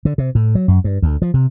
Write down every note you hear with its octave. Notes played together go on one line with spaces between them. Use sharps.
D3
C3
A2
F#3
F#2
G2
D2
F3
C3